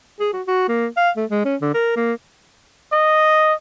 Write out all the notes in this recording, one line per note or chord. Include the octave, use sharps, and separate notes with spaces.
G#4
F#4
F#4
A#3
F5
A3
G#3
C#4
D3
A#4
A#3
D#5